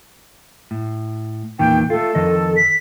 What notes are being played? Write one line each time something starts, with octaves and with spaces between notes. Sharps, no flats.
A2
E2 A#2 D#3 G5
A3 F4 A4
F2 D#3 D#5
B6